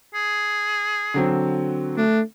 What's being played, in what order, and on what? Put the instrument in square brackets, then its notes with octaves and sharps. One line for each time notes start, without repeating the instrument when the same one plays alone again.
[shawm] G#4
[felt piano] D3 F#3 C4
[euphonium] A3 [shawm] D4